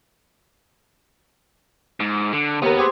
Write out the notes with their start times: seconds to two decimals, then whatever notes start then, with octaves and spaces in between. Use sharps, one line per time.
2.00 G#2
2.33 D3
2.62 D#2 B3 A#4
2.78 C4 G4 G#4